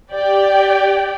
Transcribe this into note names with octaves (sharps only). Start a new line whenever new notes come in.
G4 D5 G5